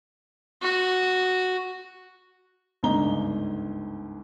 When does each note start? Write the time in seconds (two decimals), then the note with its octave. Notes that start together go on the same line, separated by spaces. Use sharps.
0.62 F#4
2.83 G1 C#2 G#2 D#5 A#5 G7